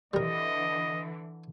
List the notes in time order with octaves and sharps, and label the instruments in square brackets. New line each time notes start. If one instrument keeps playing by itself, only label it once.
[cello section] D3 E3 [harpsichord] G3 A#4 [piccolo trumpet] D#5